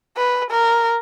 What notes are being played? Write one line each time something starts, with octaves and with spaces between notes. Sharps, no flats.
B4
A#4